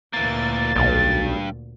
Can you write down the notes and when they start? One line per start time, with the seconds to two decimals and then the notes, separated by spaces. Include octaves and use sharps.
0.13 D2 A#2 E3 A#3 A6
0.76 B1 G2